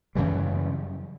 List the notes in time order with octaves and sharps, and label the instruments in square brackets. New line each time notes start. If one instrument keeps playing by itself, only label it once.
[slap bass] F#2 C#3 E3 G3